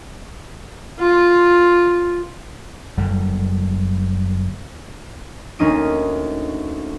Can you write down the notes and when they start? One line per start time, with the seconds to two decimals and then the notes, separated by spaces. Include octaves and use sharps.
1.00 F4
2.97 F#1 D3 G3
5.59 D2 A#3 C#4 D#4 D#7